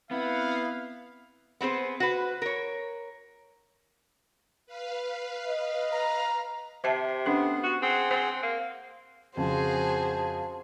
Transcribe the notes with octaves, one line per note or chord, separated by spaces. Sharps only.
B3 C4 E4 F5 B5
B3 C4 G#4 C5
F#4 B4
A#4 C#5
B4 F5
D#5
A#5
C3 C5 E5 A5
B3 C#4 D4 A4
F#4
C4 G#4 F#5
C4 C5
A#3
F2 C#3 F3 F#4 G#4 C5 A5